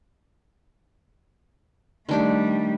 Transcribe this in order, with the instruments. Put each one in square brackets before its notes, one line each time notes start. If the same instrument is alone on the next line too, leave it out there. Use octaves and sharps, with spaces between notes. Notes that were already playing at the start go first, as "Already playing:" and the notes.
[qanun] D#3 D4 G4 [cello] G3 A3